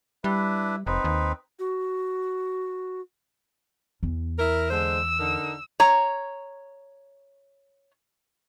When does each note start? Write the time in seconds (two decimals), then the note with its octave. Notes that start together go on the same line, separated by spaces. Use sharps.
0.24 G3 D4 E4 B4
0.87 F1 C4 D#4 B4
1.04 D#2
1.59 F#4
4.03 E2
4.39 E4 A#4
4.71 D3 G#3 C5 E6
5.19 D3 D#4 A#4
5.80 C#5 A#5